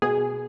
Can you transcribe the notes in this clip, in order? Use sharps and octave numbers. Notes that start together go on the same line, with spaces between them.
B2 G#4